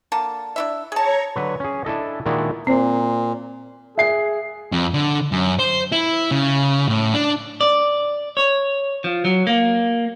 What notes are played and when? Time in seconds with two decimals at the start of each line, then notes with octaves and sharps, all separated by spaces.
0.12 D3 A#3 A5
0.56 D4 E4 E5
0.92 G#4 C#5 A5 A#5 C#6
1.36 D3 F#3 B4
1.60 C#4 G#4
1.85 D4 E4 A4 D#5
2.26 A#2 D#3 G#3 D4 E4 F#4
2.67 A#2 C4 C5
3.98 G#4 E5 C7
4.72 F2
4.94 D3
5.32 F#2
5.59 C5
5.92 E4
6.31 C#3
6.88 A2
7.14 D4
7.61 D5
8.37 C#5
9.04 F3
9.25 F#3
9.47 A#3